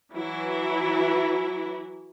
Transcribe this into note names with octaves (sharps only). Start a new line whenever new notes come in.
E3 F#3 E4